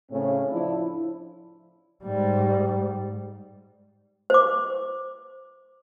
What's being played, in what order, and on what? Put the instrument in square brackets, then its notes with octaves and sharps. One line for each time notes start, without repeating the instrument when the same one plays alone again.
[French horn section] A2 C#3 C4 C#4
F3 D4 E4
[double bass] G#2 G3
[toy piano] C5 D6